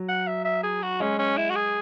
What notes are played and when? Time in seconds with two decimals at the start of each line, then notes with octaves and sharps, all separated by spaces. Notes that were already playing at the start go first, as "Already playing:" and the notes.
Already playing: F#3
0.09 F#5
0.27 E5
0.45 E5
0.63 G#4
0.83 F#4
1.00 G#3 C#4
1.19 C#4
1.37 E4
1.50 F#4
1.55 G#4